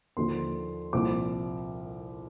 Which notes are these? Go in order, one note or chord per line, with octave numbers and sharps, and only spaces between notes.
D#2 D3 F3 C6
C2 A#2 F3 D6